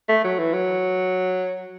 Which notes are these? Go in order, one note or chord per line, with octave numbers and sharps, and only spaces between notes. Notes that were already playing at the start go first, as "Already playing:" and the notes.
A3
F#3
E3
F#3